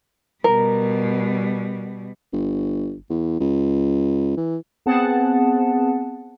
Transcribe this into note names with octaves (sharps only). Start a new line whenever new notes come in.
B2 G3 A#4
G1
E2
C#2
E3
B3 C4 G#4 F#5 A5